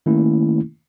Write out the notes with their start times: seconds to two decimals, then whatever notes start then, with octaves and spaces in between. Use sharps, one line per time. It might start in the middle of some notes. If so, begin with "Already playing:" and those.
0.06 D#3 A3 A#3 C#4 E4